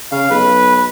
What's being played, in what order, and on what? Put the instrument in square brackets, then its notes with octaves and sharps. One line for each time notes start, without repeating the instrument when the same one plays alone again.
[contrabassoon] C#3 [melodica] F5
[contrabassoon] B1 [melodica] B4